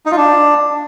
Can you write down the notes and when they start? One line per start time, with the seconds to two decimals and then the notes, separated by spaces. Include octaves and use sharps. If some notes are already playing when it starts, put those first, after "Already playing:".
0.06 D#4
0.12 F4
0.17 D4